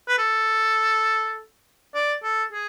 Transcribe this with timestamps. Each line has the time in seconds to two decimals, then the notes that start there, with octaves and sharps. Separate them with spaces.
0.08 B4
0.18 A4
1.95 D5
2.23 A4
2.53 G#4